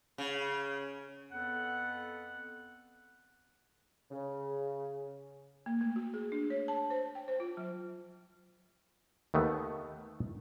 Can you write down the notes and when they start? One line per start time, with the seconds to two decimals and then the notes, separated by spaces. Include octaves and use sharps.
0.18 C#3
1.32 F2 B3 A4 F#5
4.10 C#3
5.66 A#3
5.81 A3
5.96 F#4
6.14 G#4
6.32 D4
6.50 C#5
6.68 A5
6.90 C5
7.15 G5
7.28 C5
7.40 F4
7.57 F#3
9.34 D#2 D#3 A3 B3